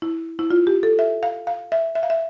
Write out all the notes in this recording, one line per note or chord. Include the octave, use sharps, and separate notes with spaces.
E4
E4
F4
G4
A4
E5
F5
F5
E5
E5
F5
E5